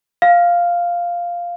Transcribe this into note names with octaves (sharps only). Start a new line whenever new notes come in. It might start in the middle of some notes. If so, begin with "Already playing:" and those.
F5